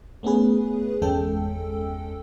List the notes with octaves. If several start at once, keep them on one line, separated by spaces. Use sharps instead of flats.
A3 B3 C#4 G#4 B4
G1 E2 G#3 C#4 A4 G5